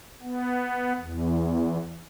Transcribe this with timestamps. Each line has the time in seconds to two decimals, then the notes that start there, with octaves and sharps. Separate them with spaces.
0.21 B3
0.99 E2